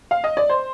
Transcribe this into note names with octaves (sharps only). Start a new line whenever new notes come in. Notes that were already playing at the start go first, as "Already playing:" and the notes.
F5
D#5
D5
C5